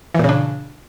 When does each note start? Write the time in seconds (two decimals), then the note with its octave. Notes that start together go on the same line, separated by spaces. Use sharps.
0.14 E3
0.19 A#2
0.24 C#3
0.29 D4